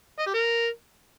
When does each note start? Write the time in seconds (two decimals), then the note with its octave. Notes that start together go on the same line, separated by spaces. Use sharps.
0.19 D#5
0.27 G4
0.34 A#4